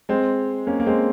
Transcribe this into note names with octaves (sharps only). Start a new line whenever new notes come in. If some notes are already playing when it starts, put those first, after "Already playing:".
G#3 C4
A#3 C#4
A#3
G#3 C4